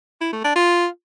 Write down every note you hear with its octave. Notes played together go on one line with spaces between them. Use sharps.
E4
A3
D4
F4